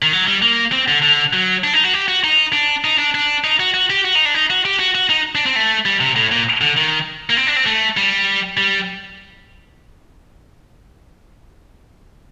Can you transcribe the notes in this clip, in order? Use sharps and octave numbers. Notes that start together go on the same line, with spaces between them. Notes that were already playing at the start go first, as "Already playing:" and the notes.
D#3
F#3
G3
A#3
C4
D3
D3
F#3
D4
D#4
F#4
G4
F#4
D#4
D4
D#4
D4
D4
D#4
F#4
F#4
G4
F#4
D#4
D4
D#4
F#4
G4
F#4
F#4
D#4
D4
C4
A3
G3
C3
A2
A#2
D3
D#3
A#3
C4
D4
C4
A3
G3
G3